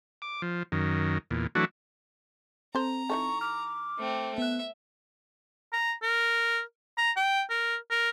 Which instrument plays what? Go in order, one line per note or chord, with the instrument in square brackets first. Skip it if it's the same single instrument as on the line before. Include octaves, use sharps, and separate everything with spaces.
[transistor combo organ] D6
F3
F#2 D#3
E2 A#2
E3 F#3 A3 D4 F#4
[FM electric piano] C4 [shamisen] A4 C5 [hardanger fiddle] A#5
[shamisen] E3 D#4 A4 [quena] C#6
[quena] D6 [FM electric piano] F6
[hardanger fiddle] A3 C4
[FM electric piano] B3 F#6 [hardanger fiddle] E5
[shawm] A#5
A#4
A#5
G5
A#4
A#4